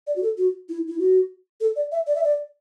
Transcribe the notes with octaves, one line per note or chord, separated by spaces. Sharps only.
D5
F#4
A4
F#4
E4
E4
F#4
A4
D5
E5
D5
E5
D5